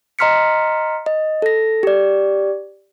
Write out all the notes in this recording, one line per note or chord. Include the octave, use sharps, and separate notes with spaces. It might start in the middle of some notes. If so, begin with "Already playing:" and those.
D#5 A#5 C6 F6 B6 C#7
D#5
A4 A#6
G4 D5